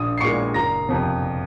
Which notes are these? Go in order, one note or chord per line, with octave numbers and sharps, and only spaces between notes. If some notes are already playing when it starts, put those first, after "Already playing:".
Already playing: A#1 D#6 D#7
C7
A#2 G#3 C#6 C#7
F#1 A#5 A#6
F2 C3